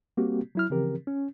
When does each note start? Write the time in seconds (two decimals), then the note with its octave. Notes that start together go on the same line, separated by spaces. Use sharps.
0.17 G3 A#3 C4 F#4 G4
0.55 F#3 E4 F6
0.70 C#3 E3 F3 C4 G4 A#4
1.07 C#4